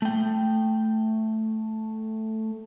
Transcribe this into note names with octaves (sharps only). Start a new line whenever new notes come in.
A3 G5